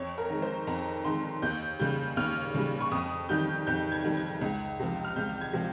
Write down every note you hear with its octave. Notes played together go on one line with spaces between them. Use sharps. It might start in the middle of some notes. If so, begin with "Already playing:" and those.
Already playing: F2 C#5
A#4
D#3 G#3
C5
F2 A#5
D#3 G#3 C6
D#2 G6
C#3 G3 G6
D#2 F6
C#3 G3
C#6
F2 D#6
D#3 G3 G6
F2 G6
G#6
D#3 G3
G#6
C#2
C3 F3
F6
C#2 G6
G#6
C3 F3